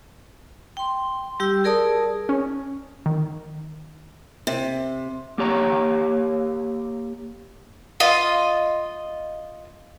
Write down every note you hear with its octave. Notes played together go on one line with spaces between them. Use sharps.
G5 C6
G3 G4 G5 E6
G#4 A#4 D5 A5 D#6
C#4
D#3
C3
A#3 G4 C#5 A#5
F4 D#5